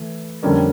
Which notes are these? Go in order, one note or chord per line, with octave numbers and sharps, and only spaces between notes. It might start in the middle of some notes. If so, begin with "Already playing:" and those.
Already playing: E3 A3
F2 D3 G3 A#3 C#4